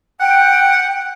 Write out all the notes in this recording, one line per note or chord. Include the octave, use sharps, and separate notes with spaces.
F#5 G5